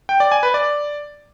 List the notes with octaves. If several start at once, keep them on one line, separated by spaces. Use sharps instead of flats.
G5
D5
G#5
B4
D5